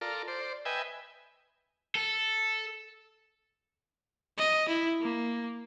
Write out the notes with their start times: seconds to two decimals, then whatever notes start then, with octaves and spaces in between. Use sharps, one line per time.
0.01 F4 A4 A#4 D5
0.28 C5 D5
0.65 B4 D#5 E5 G5 G#5
1.95 A4
4.38 D#5
4.69 E4
5.01 A#3